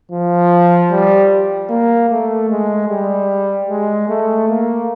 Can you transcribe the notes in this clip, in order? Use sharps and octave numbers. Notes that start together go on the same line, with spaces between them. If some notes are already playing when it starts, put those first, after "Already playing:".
F3
G3
A#3
A3
G#3
G3
G#3
A3
A#3